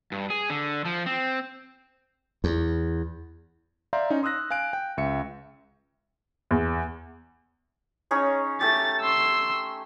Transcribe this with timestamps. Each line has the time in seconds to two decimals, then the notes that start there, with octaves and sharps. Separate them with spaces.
0.12 G2
0.30 G#4
0.50 D3
0.85 F3
1.06 C4
2.44 E2
3.93 D5 E5 F5 A#5 C6 G6
4.10 C#4 D#4
4.23 C6 D#6 E6 F#6 A#6
4.51 F5 G#5 F#6 D7
4.73 G5
4.97 C#2 E5 C#7
6.51 E2
8.11 C#4 D#4 G#4
8.61 A3 G4 A6
9.01 C6 E6